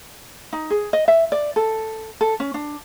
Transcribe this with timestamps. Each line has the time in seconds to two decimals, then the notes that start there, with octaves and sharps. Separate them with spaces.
0.53 D#4
0.70 G#4
0.93 D#5
1.08 E5
1.32 D5
1.56 A4
2.21 A4
2.40 C#4
2.54 D4